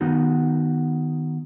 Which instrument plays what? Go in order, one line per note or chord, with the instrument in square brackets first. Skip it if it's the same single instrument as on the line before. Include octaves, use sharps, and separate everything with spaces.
[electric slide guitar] D#3 B3 D#4 F#4